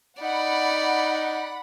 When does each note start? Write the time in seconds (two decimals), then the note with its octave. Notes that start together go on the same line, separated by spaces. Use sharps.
0.22 D#4 D5 F#5 B5